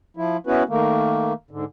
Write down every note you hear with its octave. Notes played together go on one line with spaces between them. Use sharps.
F3 E4
B3 C#4 E4 F#4 B4
D#3 A3 A#3
G#2 D3